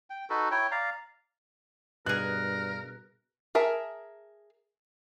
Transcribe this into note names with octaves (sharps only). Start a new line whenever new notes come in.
G5
D#4 F#4 A4 B4
E4 C#5 G5
D5 F5 A#5
G2 B2 G#4 A#4 F#6
G#4 A#4 E5 A5